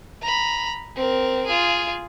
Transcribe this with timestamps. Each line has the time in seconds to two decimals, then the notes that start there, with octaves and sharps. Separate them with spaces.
0.22 A#5 B5
0.96 C4 A#4
1.46 F4 G#4